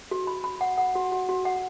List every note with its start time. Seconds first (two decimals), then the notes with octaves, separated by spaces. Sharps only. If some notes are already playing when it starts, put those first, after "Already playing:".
0.11 F#4
0.27 B5
0.44 B5
0.61 F#5
0.78 F#5
0.95 F#4
1.12 F#4
1.29 F#4
1.45 F#5